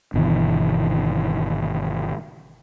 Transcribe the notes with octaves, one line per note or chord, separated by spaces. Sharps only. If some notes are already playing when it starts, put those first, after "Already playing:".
G1 B2 D#3 E3